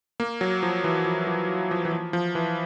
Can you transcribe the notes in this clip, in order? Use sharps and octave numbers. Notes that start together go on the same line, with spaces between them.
A#3
F#3
F3
E3
F3
F3
F3
E3
F3
F3
E3